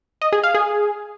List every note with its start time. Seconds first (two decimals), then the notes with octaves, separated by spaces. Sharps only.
0.22 D#5
0.33 G#4
0.44 F5
0.55 G#4